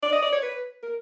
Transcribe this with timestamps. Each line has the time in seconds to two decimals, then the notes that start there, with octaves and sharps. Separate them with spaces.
0.03 D5
0.13 D#5
0.22 D5
0.32 C#5
0.42 B4
0.83 A#4